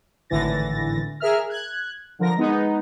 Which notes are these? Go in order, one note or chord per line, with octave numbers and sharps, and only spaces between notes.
G#1 A2 D3 E3 A6 A#6
G#4 A#4 E5 F6
F#6 G#6
D3 F3 A#4 A#6
G#3 B3 D#4